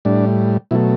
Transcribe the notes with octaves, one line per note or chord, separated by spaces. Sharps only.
A2 G3 D4
B2 F#3 A3 E4